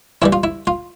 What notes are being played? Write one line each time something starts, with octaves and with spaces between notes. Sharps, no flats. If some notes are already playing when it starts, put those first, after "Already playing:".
G2 E3 G3 E4
F4
E4
F4